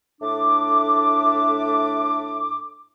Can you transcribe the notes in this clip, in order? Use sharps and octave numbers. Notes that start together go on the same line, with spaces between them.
A2 A3 D4 D6